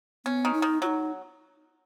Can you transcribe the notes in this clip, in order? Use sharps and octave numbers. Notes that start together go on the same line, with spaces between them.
B3 C#4
D#3
D#4
D#3
F#3 D#4 F4